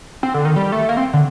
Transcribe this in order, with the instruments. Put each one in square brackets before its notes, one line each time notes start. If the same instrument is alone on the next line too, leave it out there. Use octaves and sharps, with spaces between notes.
[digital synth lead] C4
D3
D#3
G3
A3
A#3
C4
D3